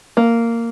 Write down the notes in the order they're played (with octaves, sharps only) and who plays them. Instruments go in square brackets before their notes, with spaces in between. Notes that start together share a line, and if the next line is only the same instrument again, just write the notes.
[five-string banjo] A#3